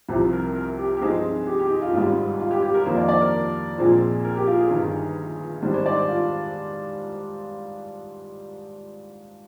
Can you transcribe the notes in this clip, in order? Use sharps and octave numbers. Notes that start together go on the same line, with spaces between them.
C2 C3 F3 G4
A#4
A#4
G4
G4
G2 F3 G#3 C4 D#4 G#4
G4
G4
D#4
F4
G#1 G#2 G3 F4
F4
G4
G4
A#4
F2 D#3 A#3 D4 C5
D5
D5
A#4
A#1 A#2 F3 G#3 C4
A#4
G4
F4
G#4
G1 G2 D#3
G#2 D#3 G3 D4 C5
C5
D5
C5
F4